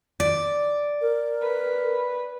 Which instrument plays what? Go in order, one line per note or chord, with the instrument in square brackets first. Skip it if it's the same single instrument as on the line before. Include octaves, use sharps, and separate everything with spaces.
[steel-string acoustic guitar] D5
[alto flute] A#4
[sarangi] B4